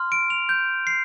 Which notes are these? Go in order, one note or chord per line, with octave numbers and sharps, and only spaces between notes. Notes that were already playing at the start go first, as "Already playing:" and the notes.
Already playing: C6 F6
D7
F7
G6
C7